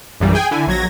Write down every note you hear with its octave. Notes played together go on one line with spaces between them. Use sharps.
A#1 F#2 A#2 E3 G3
G#4 G5 G#5
D3 E4 G#5
A#1 F#3 G#6 A#6